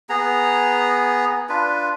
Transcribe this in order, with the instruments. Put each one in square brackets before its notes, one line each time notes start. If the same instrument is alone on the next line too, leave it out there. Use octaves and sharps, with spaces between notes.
[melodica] B3 G#4 A#5
D4 F4 B4